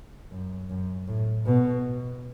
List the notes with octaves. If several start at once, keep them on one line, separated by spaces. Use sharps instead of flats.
F#2
F#2
A2
B2